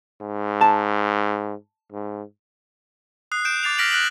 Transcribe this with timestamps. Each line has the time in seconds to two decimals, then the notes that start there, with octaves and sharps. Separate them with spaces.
0.21 G#2
0.61 A5
1.92 G#2
3.32 D#6 F#6 C7
3.45 G6 D7 E7
3.63 D6 A6 C7 F7
3.78 F6 A#6 B6 D7 F#7
3.91 F#6 D7 F#7